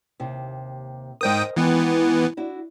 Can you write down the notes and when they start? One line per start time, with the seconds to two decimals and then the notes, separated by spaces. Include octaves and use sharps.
0.20 D#2 C3
1.21 G#2 A#4 C5 D#5 G5 D#6
1.56 D#3 E3 G#3 B3 E4
2.37 D4 E4 F#4